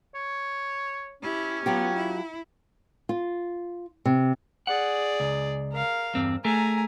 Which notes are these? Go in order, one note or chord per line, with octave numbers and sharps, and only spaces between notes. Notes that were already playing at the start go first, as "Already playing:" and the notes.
C#5
C#4 E4 G4
F#3 B3 F4 G4
E4
F4
C3
G#4 D5 F#5
C#2
A#4 F5
E2 G2 C4
A3 G#4 A#4 G#5 A#5